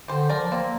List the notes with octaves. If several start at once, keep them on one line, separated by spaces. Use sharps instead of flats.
D3 G4 C5
F3 A#4 D5
A#3 C4